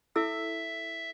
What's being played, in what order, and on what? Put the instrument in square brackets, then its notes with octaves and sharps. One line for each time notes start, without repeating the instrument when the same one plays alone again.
[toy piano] E4 A4 E6 [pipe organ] E5